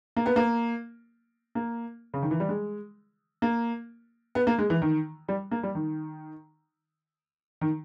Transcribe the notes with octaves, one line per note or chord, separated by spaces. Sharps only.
A#3
B3
A#3
A#3
C#3
D#3
E3
G3
G#3
A#3
B3
A#3
G#3
E3
D#3
G3
A#3
G3
D#3
D#3